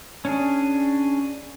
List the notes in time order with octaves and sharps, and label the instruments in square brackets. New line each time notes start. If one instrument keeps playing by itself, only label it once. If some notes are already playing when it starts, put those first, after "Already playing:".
[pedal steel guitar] C#4 D4 G#4